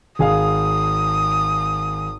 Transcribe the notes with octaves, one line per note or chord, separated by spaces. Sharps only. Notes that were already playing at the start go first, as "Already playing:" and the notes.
G#1 G#4 F5 D#6